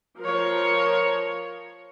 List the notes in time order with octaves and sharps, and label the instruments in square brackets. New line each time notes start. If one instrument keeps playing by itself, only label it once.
[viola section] F3 A#4 C#5